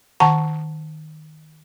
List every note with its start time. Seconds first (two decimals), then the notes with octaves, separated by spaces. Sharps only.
0.20 D#3 F#5 A5 A#5 C#6